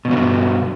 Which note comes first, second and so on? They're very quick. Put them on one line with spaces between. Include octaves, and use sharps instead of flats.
B2 E2 F#3 D3 G2